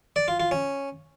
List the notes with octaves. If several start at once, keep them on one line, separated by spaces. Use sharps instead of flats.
D5
F4
F4
C#4